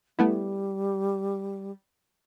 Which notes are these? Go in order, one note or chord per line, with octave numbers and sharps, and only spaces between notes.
G3 A3 B3 E4